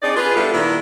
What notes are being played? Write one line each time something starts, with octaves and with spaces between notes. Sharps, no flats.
C4 D4 D#4 G#4 D5
F4 G#4 B4
G3 B3 D4 E4 F4 A4
A#2 D#3 D4 E4